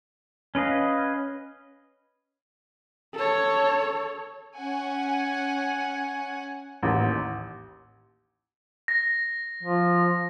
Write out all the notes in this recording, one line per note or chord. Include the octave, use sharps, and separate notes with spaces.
C#4 B4 D#5 F5
A4 C#5
C#4 F#5 G#5
A1 D#2
A#6
F3